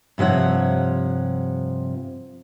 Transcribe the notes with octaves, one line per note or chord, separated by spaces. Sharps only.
G2 C3 F3 C#5 F#5